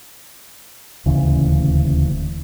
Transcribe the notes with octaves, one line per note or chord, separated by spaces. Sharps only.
D#1 D2 C#3 E3